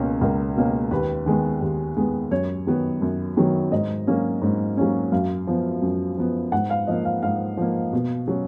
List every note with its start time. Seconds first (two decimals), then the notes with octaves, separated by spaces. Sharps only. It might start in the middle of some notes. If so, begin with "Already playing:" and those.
Already playing: C#2 B2 A#3 C#4
0.21 C#2 A#4
0.56 B2 A#3 C#4
0.91 D#2 B4
1.26 D#3 G#3 B3
1.61 D#2
1.97 D#3 G#3 B3
2.31 F#2 C#5
2.67 D#3 F#3 B3
3.02 F#2
3.37 D#3 F#3 B3
3.72 G#2 D#5
4.07 F#3 A#3 C#4
4.42 G#2
4.77 F#3 A#3 C#4
5.12 F#2 F5
5.47 F3 B3
5.82 F#2
6.17 F3 B3
6.52 G#2 F#5
6.70 F5
6.87 F3 A#3 D#5
7.05 F5
7.23 G#2 F5
7.57 F3 A#3
7.93 B2
8.28 F#3 C#4